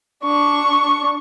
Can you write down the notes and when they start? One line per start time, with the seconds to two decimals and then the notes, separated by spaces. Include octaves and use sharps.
0.23 D4 C#6